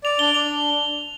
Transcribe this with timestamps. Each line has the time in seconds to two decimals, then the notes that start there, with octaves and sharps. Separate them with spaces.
0.04 D5 F7
0.19 D4 G7
0.34 D4 F7